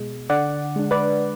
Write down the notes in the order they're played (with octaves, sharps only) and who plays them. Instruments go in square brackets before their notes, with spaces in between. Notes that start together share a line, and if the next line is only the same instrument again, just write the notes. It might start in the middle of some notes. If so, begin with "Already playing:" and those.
Already playing: [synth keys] B2 G#3
D3 D5 F#5
G#3 D4
B4 D5